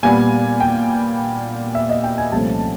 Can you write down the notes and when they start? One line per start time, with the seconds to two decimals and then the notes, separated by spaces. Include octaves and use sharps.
0.03 A#2 G3 B3 G#5
0.60 G5
1.75 E5
1.89 D#5
2.04 G5
2.18 G#5
2.32 C2 A#2 F3 A3 C#4 A5